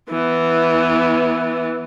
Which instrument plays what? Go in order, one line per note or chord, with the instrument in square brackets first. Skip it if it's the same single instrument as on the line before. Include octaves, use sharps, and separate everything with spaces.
[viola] E3 B3